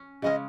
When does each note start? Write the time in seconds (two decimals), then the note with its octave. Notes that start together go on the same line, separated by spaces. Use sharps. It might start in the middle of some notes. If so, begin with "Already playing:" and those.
Already playing: C#4
0.22 C#3 G#3 C#4 D#5